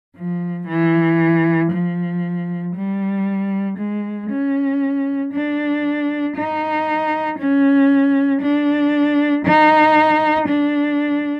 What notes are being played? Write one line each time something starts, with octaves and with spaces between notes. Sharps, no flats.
F3
E3
F3
G3
G#3
C#4
D4
D#4
C#4
D4
D#4
D4